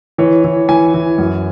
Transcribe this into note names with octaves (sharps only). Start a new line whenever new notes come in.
E3 C#5
E3
E3 G#5
E3
F#2